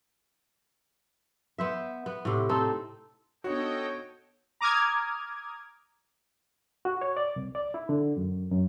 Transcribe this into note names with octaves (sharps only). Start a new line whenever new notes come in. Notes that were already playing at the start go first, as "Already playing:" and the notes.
B3 C5 E5
B3
A2 C3
C4 D#4 A4
B3 D4 D#4 F#4 A4 C#5 D#5 G5
A#5 D6 D#6 F6 G#6
F#4
C#5
D5
C2
D5
E4
D3
F#2
F#2